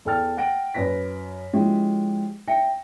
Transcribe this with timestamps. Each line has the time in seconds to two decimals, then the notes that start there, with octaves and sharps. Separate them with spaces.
0.05 E2 A4 G5 F6 A6
0.37 F#5 G5 A#6 D7
0.74 F#2 B4 A#6 B6
1.53 F3 G#3 C#4 D#4 E4 G4
2.48 E5 G5 A#6 C#7